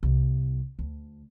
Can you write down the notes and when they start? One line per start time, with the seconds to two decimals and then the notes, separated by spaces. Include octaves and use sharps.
0.03 C2
0.79 D2